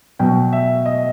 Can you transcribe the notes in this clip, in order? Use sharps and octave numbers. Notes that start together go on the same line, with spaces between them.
B2 F#3 G5
E5
D#5